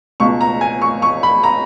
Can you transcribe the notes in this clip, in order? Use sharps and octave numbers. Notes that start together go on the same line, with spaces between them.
C#2 B2 C#6
A#5
G#5
C#6
C#6
B5
A#5